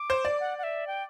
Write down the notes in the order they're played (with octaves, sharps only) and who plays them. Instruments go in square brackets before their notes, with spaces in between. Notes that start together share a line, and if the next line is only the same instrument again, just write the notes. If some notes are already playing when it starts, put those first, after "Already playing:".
Already playing: [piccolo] D6
[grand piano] C5
D5
[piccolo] F#5
F#5
E5
G5